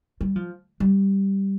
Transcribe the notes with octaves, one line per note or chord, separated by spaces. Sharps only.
G3
F3
G3